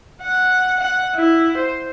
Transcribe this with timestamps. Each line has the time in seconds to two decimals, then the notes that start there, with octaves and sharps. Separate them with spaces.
0.23 F#5
0.80 F#5
1.15 E4
1.58 C5